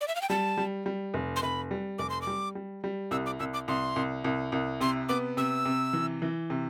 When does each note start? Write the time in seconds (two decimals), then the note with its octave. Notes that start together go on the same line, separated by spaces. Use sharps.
0.01 D5
0.08 E5
0.16 F5
0.22 G5
0.30 G3 A5
0.57 G3
0.86 G3
1.14 F1
1.36 C6
1.42 F1 B5
1.71 G3
1.98 F1 D6
2.10 C6
2.22 D6
2.27 G3
2.55 G3
2.84 G3
3.11 C2 E6
3.26 D6
3.39 C2 E6
3.53 D6
3.68 C2 C6
3.96 C2
4.24 C2
4.52 C2
4.81 C3 C6
5.09 B3 D6
5.37 C3 E6
5.65 C3
5.93 E3
6.22 E3
6.50 C3